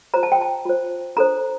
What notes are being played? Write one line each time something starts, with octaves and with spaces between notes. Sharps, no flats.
F4 C5 A#5
A5
G5
A5
F4 C5
D4 A4 C5 A#5